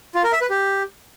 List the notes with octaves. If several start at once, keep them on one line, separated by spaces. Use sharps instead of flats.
F4
A#4
E5
B4
G4